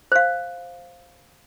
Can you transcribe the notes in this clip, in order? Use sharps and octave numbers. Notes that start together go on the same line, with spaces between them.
C5 F5